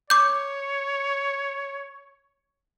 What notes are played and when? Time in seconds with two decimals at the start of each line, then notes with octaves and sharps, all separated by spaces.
0.10 C#5 D6 G6